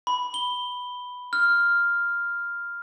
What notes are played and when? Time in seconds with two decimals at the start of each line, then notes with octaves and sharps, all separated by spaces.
0.07 B5
0.34 G7
1.33 F6